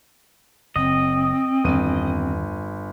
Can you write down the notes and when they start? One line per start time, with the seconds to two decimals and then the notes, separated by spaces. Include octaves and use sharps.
0.76 F#1 C4 D#5
1.64 G1 E2 D#3 E3 D#7